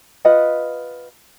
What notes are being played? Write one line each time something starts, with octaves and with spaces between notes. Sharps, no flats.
F4 B4 D#5 F#5